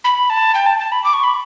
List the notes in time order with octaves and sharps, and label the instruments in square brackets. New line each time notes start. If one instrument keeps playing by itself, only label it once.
[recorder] B5
A5
G5
A5
A5
B5
D6
C#6
B5